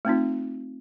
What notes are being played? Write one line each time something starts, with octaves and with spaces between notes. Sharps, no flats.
A3 C4 D#4 F4